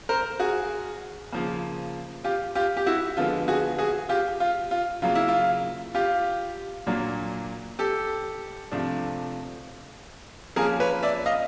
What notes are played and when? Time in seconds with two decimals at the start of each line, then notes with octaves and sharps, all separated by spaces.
0.09 A#4 C5
0.40 F#4 G#4
1.32 C#3 F3 A#3
2.24 F4 G4
2.55 F4 G4
2.77 G4
2.86 E4 F#4
3.17 D3 F3 G#3 B3 F4
3.48 F#4 G#4
3.78 F#4 G#4
4.09 F4 G4
4.40 F4
4.71 F4
5.02 C#3 F#3 A#3 F4
5.15 E4
5.28 F4
5.95 F4 G4
6.87 A#2 F#3 A#3 D4
7.79 G4 A4
8.71 C3 F3 A3 D4
10.56 F3 A#3 C#4 G#4 A#4
10.80 B4 C#5
11.03 D5 E5
11.26 D#5 F5